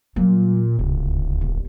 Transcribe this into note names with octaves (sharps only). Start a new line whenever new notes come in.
A#2 F#3 G3
D1 C#2 C3
G1 D#2